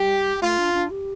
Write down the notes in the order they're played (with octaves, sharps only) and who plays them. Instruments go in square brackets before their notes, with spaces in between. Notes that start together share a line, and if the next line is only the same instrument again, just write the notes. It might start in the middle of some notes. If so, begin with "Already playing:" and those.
Already playing: [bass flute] G3 [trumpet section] G4
[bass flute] A3 [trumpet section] F4
[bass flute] D4
D4
G4